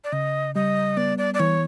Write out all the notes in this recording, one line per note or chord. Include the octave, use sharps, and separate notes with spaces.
D5
C#3 D#5
G3 D#5
B3 D5
D5
D5
E3 C#5